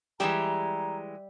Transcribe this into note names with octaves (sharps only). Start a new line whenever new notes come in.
E3 G3 G#3 G4 E5 A#5